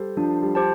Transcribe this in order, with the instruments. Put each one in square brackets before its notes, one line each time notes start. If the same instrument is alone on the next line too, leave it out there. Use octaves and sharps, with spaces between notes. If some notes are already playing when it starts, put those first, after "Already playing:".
Already playing: [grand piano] G3 A4 C5
[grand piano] F3 [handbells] D4
[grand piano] G3
[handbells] G4 C5 A5